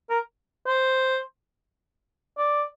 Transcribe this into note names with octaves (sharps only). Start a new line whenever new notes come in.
A#4
C5
D5